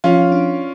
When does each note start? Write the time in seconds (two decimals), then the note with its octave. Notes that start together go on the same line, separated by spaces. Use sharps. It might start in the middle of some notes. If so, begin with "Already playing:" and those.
0.04 F3 C#4 F4
0.32 D4